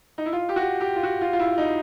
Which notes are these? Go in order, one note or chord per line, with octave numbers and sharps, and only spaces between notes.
D#4
E4
F4
G4
F#4
G4
F4
F#4
F4
F4
E4
D#4